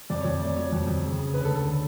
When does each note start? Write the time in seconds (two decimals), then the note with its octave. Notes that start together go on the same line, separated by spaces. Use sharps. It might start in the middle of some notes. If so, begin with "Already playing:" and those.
0.10 F2 D5
0.20 F2 C#5
0.41 A3 D5
0.56 F#3 C#5
0.72 F2
0.87 F2
1.03 C#3
1.18 C#3
1.34 D2 B4
1.45 A4
1.50 D2
1.56 A4
1.66 D3